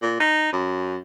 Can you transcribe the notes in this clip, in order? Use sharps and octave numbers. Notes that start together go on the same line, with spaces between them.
A#2
D#4
F#2